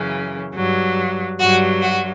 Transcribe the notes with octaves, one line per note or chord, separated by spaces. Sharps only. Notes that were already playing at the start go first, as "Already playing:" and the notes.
Already playing: F#2 C#3 E3
G2 F#3
G2 F#3 F#4
F#4